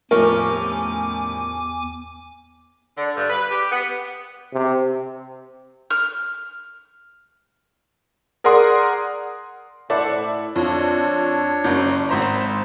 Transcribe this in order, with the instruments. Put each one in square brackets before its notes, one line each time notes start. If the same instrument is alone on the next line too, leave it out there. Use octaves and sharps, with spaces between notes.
[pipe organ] E2 G#5 D6 [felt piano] A2 F3 G3 [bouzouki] C#4 [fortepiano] A#4
[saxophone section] D3
G2
B4
G4
B3
[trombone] C3
[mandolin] F6
[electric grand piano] G#4 A#4 D5 F#5 C6 D#6
[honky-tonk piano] E4 A4 D5 [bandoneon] C5 F#5
[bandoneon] A2
[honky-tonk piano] F2 [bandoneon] D4 C#5
[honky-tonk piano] F#1 F#2
[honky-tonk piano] G#1 C5 A#5 [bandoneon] E5